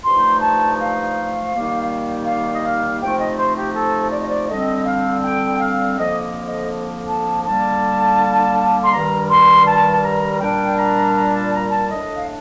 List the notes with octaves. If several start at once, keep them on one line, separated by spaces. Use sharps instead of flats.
G2 F3 A3 D#4 C6
A5
F5
D#3 G3 A#3
F5
D#5
F5
C3 F3 A3 D#4 G5
D#5
C5
G4
A4
D5
D#5
D5
D3 G3 C4 D#5
F5
G5
F5
F2 D3 F3 A#3 D#5
D#5
D#5
A5
D3 G3 A#3 A5
C6
G2 D#3 G3 A#5
C6
A5
A5
A#5
A#2 G3 D4 G5
A#5
A#5
A5
A#5
A5
A2 A3 D4 D#5
F5